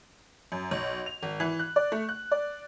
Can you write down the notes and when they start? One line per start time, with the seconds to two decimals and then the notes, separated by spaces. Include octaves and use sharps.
0.52 F#2
0.71 B1
1.06 F7
1.23 G#1
1.40 E3
1.59 F#6
1.76 D5
1.92 A3
2.09 F#6
2.32 D5